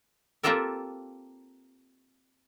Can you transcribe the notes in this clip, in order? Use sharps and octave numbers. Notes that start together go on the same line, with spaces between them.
A#3 C4 F4 G4 A4 A#4